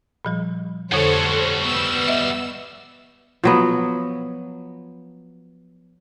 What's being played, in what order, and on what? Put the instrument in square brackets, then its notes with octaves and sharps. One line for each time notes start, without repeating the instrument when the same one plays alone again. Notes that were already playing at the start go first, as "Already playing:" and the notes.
[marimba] A#2 F3 G3
[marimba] F2 D3 [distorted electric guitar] G3 F#4 [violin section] A4 C5 C#5
[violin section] B3 E6
[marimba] D#5 E5
[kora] F3 F#3 B3